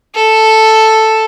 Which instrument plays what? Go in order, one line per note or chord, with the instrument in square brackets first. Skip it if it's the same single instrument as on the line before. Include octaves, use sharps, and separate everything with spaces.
[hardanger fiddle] A4